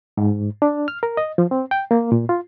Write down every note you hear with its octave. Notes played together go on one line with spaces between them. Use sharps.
G#2
D4
F6
A#4
D#5
F3
C4
G5
A#3
A#2
F4